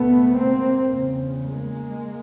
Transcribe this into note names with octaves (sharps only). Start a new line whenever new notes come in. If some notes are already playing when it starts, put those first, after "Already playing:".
Already playing: C#2 B2 A3 B3
A#3 C4
E2 C#3
G#3 A#3